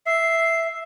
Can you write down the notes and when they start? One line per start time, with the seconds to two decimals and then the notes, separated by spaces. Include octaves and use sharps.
0.06 E5 C7